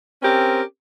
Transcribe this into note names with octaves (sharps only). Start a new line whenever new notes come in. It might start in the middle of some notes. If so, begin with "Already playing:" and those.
C4 C#4 G4 A#4